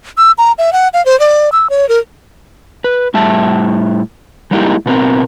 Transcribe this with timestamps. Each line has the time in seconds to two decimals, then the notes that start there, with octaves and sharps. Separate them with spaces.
0.18 E6
0.38 A#5
0.58 E5
0.73 F#5
0.94 F5
1.06 C5
1.20 D5
1.52 E6
1.70 C#5
1.89 A#4
2.84 B4
3.14 A2 G3 E5 A5
4.51 G3 G#3 A#3 D#4 E4 G4
4.86 B2 B3 C4 A#4